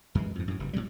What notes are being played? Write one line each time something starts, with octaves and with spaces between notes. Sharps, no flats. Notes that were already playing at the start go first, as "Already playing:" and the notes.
F#2 E3 G#3
F2 G#2
F#2 A2
F#1 G2
A2 C3 F#3 G3